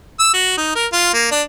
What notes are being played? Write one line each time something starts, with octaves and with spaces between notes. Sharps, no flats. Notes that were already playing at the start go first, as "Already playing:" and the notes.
E6
F#4
D#4
A#4
F4
A#3
D4